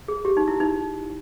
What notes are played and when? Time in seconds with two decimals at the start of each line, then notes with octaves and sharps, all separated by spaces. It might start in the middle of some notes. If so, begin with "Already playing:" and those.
0.08 G#4
0.25 G4
0.37 D#4
0.48 E4
0.60 D#4